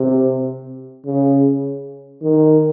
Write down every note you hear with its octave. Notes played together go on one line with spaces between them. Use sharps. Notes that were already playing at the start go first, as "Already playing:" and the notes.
Already playing: C3
C#3
D#3